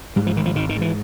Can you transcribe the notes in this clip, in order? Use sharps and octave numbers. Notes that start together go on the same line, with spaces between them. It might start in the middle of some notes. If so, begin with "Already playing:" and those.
G#2 G3
F3
G#1 D#3
F3
G#1 D#3
D#3
G#2
E3